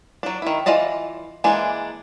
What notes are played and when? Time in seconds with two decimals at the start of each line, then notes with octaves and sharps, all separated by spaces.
0.23 F#3 D4
0.42 D#3 E4
0.66 E3 F4 D5 D#5 A5
1.44 E3 G#3 A#3 D4